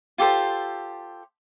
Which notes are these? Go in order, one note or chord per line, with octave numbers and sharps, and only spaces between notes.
F4 G4 A4 C5